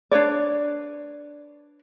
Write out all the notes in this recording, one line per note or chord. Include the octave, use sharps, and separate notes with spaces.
D4 B4 C#5 D5